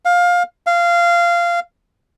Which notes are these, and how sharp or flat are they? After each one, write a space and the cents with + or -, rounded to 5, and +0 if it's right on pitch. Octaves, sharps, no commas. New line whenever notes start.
F5 +20
F5 -15